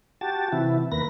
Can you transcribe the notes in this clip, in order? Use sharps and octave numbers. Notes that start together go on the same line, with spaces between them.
F#4 G4 A5
C3 E3 E4
D#2 A#3 B4 A#6